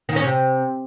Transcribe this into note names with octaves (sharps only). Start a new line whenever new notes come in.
D#3
C#4
C3